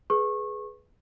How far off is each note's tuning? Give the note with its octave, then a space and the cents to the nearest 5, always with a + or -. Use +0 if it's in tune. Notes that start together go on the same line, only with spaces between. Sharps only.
G#4 +15 B4 +0 C#6 -25